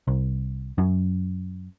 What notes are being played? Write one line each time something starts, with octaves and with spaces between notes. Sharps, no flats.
C2
F#2